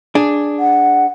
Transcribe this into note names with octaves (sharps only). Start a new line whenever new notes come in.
D4 G#4
F#5